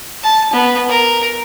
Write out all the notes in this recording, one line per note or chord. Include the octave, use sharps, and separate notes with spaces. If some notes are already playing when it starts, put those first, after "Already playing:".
A5
B3
A#4